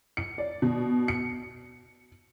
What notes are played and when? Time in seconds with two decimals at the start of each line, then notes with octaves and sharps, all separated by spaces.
0.17 C#7
0.38 D5
0.62 B2
1.08 C#7